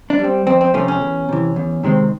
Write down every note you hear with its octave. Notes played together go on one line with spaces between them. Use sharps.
D4
G3
C4
F2 C4
C4
C3 F3 A3 C4 C#4
C#4
E2
C3 E3
E2
C3 D#3 G#3 C4